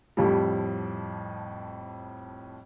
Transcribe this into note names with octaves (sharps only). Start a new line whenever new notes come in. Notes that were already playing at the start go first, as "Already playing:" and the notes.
F2 A2 F3 G3